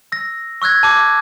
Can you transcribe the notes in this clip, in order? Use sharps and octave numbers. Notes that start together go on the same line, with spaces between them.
E6 A#6
C#6 E6 F#6 G#6 A#6
A5 D6